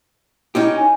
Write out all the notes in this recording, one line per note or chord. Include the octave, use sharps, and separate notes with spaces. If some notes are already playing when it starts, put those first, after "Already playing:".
C#4 D#4 E4 G4
G#5